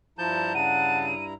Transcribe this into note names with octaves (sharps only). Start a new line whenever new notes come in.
G2 F3 E4 A5 A#5 G6
C#3 F#5 A5 D#7